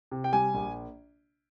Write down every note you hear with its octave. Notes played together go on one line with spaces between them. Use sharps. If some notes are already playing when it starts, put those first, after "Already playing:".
C3
G5
G3 G#5
A#1